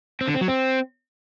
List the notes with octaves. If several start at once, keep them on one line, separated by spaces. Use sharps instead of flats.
C4
D3
C4
F#3
C4